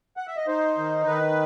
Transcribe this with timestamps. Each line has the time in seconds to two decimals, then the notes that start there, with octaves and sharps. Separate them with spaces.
0.17 F#5
0.27 E5
0.37 D#5
0.47 D#4 C5
0.78 D#3
1.07 D#3 B4